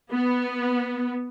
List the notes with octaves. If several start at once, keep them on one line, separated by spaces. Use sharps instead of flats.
B3